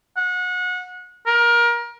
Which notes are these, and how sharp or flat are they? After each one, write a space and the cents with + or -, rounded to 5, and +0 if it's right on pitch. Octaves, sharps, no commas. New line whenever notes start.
F#5 -30
A#4 +25